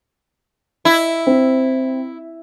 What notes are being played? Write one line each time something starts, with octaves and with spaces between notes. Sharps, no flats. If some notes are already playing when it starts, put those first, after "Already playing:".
E4
C4